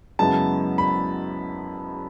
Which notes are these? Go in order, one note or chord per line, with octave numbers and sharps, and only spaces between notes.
F#2 C#3 G#3 B3 E4 A5
B5